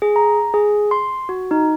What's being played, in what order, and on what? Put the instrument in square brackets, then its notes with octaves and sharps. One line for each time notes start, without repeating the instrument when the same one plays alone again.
[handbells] G#4
A#5
G#4
C6
F#4
D#4